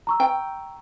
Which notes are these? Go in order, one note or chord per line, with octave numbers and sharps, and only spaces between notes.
A#5 C#6 E6
G5